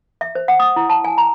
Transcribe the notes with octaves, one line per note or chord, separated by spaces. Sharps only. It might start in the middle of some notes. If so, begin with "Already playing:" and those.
E5
C5
F#5
D#6
E4
A5
G#5
A#5